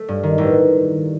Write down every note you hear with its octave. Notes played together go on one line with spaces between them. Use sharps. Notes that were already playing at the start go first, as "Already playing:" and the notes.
Already playing: A3
G2
D#3
A1